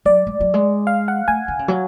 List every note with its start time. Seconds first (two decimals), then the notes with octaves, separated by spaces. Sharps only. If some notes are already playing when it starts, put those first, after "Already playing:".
0.05 F#3 D5
0.27 G#3
0.40 F#3
0.54 G#3
0.87 F5
1.08 F#5
1.28 A3 G#5
1.48 D3
1.59 C#3
1.68 F#3